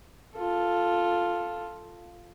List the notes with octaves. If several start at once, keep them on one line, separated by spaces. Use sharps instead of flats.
F4 A4